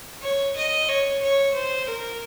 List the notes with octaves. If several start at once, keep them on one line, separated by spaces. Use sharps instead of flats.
C#5
D#5
C#5
C#5
C5
A#4